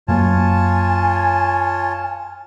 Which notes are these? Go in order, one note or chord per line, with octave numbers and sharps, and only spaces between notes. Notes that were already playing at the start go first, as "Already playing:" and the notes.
F#2 F#3 A#3 F4 C#5 G#5 A5